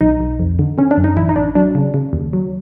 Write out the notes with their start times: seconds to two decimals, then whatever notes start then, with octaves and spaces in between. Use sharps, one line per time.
0.01 B1 D#4
0.20 B1
0.39 F2
0.59 D3
0.78 D3 C#4
0.91 D4
0.97 F#2
1.04 D#4
1.16 A1 E4
1.29 D#4
1.36 A1 D4
1.55 F#3 D4
1.75 C#3
1.94 C#3
2.13 D#2
2.33 F#3